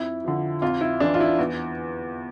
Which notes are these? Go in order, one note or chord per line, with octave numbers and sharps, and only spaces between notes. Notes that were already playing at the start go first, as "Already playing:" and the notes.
Already playing: F2 E4
D3 F3
F2 F4
E4
E3 D4
F4
E4
E2